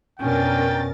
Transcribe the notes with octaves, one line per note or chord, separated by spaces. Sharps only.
F2 B2 C#4 D4 A#4 G5 A6